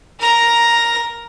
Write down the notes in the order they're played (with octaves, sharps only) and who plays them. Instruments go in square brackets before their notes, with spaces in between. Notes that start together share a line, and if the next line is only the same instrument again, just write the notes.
[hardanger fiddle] A#4 A#5